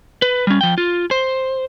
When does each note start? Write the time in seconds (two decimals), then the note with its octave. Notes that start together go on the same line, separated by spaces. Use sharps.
0.22 B4
0.47 G3 C#4
0.61 F3 G5
0.78 F4
1.11 C5